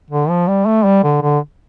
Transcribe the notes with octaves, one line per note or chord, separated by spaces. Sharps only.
D3
F3
G3
A3
G3
D3
D3